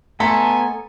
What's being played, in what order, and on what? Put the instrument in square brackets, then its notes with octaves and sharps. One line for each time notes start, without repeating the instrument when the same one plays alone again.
[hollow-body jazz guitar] A3 [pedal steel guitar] B3 A#5 C6 [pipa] A4 [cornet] G#5